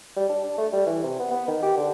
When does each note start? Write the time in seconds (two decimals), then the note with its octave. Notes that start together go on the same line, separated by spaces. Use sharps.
0.17 G3
0.29 D4
0.44 D4
0.58 A3
0.73 G3
0.87 E3
1.04 C3
1.20 B3
1.31 B3
1.48 D#3
1.63 G4
1.77 D3